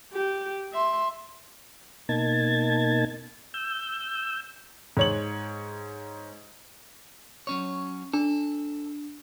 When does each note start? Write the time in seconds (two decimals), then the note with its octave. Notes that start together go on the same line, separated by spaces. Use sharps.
0.13 G4
0.73 E5 C6
2.09 B2 A#3 D#4 A5 G#6 A6
3.54 E6 G6
4.97 G#2 C#5 F#7
7.47 F#3 C#4 C#5
8.14 D4 A4